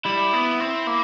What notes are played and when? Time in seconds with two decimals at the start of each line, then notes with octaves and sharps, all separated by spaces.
0.06 G3 E4
0.33 B3
0.60 C4
0.87 A#3